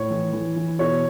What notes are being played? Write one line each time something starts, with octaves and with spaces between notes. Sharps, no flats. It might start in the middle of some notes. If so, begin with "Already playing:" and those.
Already playing: A2 C#5
E3
E3
E3
B2 C#5